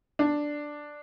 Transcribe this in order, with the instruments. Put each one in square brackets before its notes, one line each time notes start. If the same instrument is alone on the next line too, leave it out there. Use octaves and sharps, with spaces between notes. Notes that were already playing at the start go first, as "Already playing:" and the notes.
[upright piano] D4